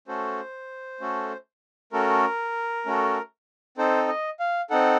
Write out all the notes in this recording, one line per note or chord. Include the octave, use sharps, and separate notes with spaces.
A3 C#4 F#4 A4 C5
A3 C#4 F#4 A4
A3 C#4 F#4 A4 A#4
A3 C#4 F#4 A4
C4 D#4 A4 C5
D#5
F5
C4 D#4 A4 F#5